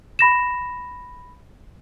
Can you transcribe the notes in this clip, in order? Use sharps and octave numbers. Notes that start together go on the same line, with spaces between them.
B5 A#6 E7